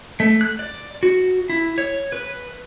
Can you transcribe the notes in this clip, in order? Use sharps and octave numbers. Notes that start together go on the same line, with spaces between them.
A3
F#6
D5
F#4
E4
C#5
B4